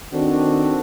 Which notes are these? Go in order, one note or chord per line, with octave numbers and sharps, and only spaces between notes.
D#3 C4 D4 F#4 A4